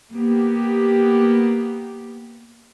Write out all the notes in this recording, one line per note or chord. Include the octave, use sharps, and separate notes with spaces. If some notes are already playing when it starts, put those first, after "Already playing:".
A#3 B3 G4